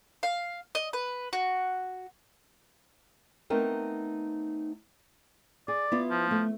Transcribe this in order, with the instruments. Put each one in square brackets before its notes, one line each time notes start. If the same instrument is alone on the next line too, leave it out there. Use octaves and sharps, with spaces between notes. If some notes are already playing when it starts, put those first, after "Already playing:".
[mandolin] F5
D#5
B4
F#4
[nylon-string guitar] A3 B3 C4 D#4 A#4
[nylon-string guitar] G#4 [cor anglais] D5
[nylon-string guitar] B3 E4 F4
[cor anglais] F3
[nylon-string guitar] A3